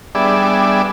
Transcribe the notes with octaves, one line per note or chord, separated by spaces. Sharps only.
G3 B3 D4 G#4 D5 E5